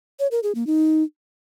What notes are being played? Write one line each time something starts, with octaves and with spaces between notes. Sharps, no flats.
C#5
A#4
G#4
A#3
D#4